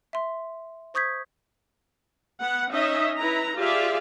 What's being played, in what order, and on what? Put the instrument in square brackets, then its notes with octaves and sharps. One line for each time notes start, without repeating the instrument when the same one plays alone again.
[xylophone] E5 C6
C5 C#6 D#6 G6 G#6 B6
[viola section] B3 F#5
C#4 D#4 D#5 E5
E4 B4 A#5
F4 G4 G#4 D5 E5 F5